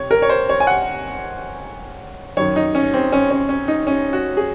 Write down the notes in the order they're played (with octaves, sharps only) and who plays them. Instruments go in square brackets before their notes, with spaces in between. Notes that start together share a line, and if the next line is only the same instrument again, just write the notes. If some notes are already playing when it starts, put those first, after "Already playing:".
Already playing: [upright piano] C3 C#5
A#4
C#5
C5
C#5
G#5
F#5
F#2 D#3 C#5
D#4
C#4
C4
C#4
C#4
C#4
D#4
C#4
F#4
G#4